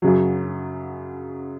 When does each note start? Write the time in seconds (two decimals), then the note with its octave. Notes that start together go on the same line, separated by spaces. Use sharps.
0.02 F#2 C#3 F#3